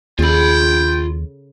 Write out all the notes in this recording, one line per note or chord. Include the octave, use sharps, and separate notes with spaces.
D#2 C#3 F4 A4 G5 B5